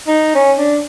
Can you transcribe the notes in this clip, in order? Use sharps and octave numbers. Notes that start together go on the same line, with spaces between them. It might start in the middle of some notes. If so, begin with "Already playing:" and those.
D#4
C#4
D4